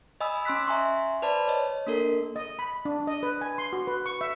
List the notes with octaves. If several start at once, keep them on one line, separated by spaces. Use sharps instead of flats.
D#5 G#5 B5 D#6 E6
C#4 C6 E6 F#6 B6
E5 G#5 A#5 C6 C#6
B4 C5 D5 A5 B5
C#5 D#5
A#3 D4 A4 A#4
D#5
B5
D4
D#5
B4
G#5
C6
F#4
B4
C#6
E5